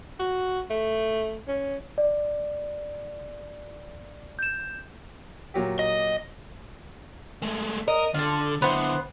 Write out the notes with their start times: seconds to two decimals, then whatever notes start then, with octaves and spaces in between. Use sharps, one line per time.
0.20 F#4
0.70 A3
1.48 C#4
1.98 D5
4.39 G6 E7
5.54 A#2 F#3 G4
5.79 D#5
7.42 G#3 A3
7.88 A#4 D#5
8.14 D3 F4 A4
8.62 D3 B3 E4 C5 F#5